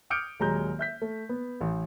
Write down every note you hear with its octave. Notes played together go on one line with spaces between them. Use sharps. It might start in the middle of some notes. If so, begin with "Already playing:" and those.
D6 D#6 F6 G6 C#7 D7
D#1 F#3 G#3 A#5 G6
E5 G6 B6
A3
B3
A1